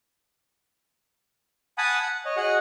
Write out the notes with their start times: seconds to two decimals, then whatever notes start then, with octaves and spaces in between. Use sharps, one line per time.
1.78 F#5 G#5 A5 B5 D#6
2.03 F#5
2.25 C#5 D#5
2.37 F#4 G#4 D#5 F#5